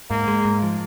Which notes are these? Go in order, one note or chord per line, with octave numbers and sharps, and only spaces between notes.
G#2 A#3
G#3
G#2
F3